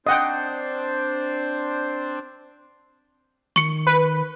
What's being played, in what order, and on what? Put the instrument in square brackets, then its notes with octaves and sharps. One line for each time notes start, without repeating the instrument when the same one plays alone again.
[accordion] C4 D4 C5 [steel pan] D#5 F#5 G5
[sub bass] D#3 [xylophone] C#6 C#7
[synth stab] B4